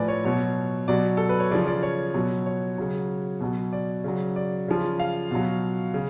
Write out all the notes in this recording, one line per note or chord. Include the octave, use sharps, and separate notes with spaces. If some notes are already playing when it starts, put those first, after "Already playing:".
Already playing: A2 F3 B4 D5 G#5
C#5
B2 F#3 C#5
B2 F#3 D5
A4
B4
C#5
C#3 F3 D5
D5
C#5
B2 F#3
C#5
C#3 F#3
B2 F#3
D5
C#3 F#3
D5
C#3 F3
F5
B2 F#3
C#3